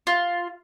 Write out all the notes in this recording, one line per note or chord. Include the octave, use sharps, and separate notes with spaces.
F4